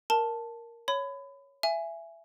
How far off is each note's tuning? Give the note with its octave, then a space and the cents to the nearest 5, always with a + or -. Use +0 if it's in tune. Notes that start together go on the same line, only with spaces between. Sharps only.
A#4 +0 A5 +0
C#5 +0 B5 +25
E5 +20 G#5 +0